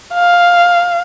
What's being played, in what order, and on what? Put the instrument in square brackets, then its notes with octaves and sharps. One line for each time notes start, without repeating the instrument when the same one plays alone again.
[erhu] F5